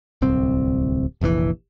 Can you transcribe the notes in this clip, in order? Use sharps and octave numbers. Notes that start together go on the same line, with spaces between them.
D1 C2 C4
F1 A#1 A#2 E3